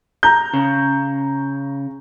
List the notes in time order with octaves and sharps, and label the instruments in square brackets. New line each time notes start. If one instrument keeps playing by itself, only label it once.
[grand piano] A#5 G6
[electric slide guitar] C#3